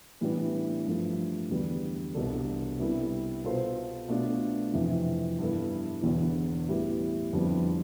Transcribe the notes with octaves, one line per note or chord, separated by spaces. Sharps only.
A2 E3 G3 B3 D4
G2 F3 A3
E2 D3 G3 B3
C2 B2 B3 D4 A4
C3 G3 B3 E4 A4
B2 B3 F4 A4 C5
B2 A3 D4 F4
F2 C3 E3
G2 E3 B3 E4 A4
E1 E2 D3
A2 G3 B3 E4 G4
F2 D3 G3 B3 E4